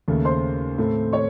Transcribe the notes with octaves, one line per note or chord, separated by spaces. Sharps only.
D#2 C#3 A3
C5 C6
A2 A3 C4
C#5 C#6